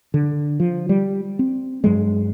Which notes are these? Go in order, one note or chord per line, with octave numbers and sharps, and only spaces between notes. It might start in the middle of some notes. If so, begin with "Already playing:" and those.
D3
F3
G3
C4
G2 F#3 G#3